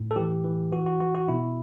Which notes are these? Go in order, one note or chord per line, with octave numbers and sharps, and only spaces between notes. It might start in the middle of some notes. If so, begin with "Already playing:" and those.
Already playing: A2
A4
E3 G4
E3
E3 F#4
F#4
E3 F#4
F#4
B2 E4